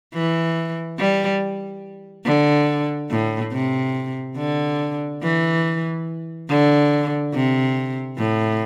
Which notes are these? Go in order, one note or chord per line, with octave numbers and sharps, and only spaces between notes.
E3
G3
D3
A2
C3
D3
E3
D3
C3
A2